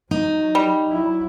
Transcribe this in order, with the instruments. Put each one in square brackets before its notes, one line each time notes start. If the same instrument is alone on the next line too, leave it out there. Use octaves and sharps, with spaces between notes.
[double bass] F#3 [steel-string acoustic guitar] D#4
[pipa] G3
[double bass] F#3 E4